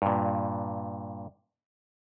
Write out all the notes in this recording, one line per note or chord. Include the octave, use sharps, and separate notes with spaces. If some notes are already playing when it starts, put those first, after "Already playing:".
G2 A#2